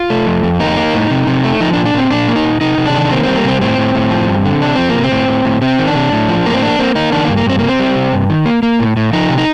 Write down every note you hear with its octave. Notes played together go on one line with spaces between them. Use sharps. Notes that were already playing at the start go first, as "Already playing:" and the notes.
Already playing: F4
A3
F2
F2
A#3 D#4
A#3
A2
C3
C3
A3
F3 D#4
D4
A#2
D4
A#2 C4
A#2 D4
A#3
D#4
A#2
C3 D#4
C3
D4
D#3
A#3 C4
G3 C4
A#3
C3 C4
A2 C4
A2
A2
F3
G2
D3
C3 D4
F3 C4
A#3
C3
C4
A2
A2
A2
C3 C4
D#3
D4
C3
A2
F3
A2 A#3
C4
A#3 D4
A#3 C4
A#3 D#4
D#3 D4
A#3
G2
A#3
G2 C4
C3 A#3
C4
G3
C3
G2
D#3
A#3
A#3
A2
A2
F3 D#4
C3
D#4